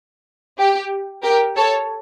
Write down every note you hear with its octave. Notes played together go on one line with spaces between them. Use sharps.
G4
G4 A#4
A4 C#5